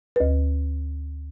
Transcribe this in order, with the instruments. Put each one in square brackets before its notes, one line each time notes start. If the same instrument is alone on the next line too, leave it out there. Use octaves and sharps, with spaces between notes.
[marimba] D2 B4